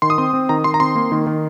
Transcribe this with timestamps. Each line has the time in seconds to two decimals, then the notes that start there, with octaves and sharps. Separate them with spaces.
0.02 D#3 C6
0.10 D#6
0.18 C4 C6
0.33 C4
0.49 D#3 A#5
0.64 D#3 C6
0.74 A#5
0.80 C4 C6
0.96 A#3
1.12 D#3
1.27 D#3